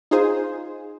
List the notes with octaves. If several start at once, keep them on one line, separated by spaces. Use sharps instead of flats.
D#4 F4 G#4 C5